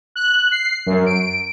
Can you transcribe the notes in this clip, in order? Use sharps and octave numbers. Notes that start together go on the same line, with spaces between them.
F#6
C7
F#2
D7